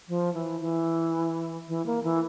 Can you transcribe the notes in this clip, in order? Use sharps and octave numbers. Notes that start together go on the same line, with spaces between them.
F3
E3
E3
E3
A#3
E3